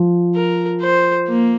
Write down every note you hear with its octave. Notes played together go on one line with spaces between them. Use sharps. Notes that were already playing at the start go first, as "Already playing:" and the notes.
Already playing: F3
A#4
C5
A#3